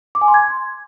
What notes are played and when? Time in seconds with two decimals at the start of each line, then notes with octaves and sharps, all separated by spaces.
0.15 D6
0.21 G#5
0.28 C6
0.34 G#6